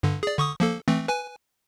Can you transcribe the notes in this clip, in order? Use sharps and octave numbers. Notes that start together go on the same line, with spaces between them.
G2 D3
G#4 D5
D3 C#6 D#6
F3 A#3 A4
E3 A3 C4
B4 G#5